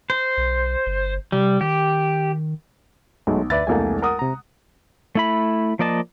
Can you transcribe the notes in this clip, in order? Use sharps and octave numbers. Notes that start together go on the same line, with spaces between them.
C5
B1
G1
C3 G3
D#3 G4
B1 F#3 G#3 A3
D2 B4 D5 E5 A6
E1 C2 A3 A#3 G#5
A#4 F#5 D#6
C3 A#5
A3 E4 B5
F3 A#3 D5 D#5 A5